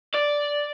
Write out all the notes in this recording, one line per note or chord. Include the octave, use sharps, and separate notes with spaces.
D5